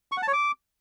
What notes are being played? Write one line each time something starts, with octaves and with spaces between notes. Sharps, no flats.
C#6
F#5
A5
C#5
D6